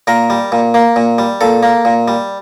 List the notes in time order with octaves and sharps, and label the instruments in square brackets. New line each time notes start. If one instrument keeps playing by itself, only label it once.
[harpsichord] A#2 A#4
G3
A#2
A#3
A#2
G3
A#2 A4
A#3
A#2
G3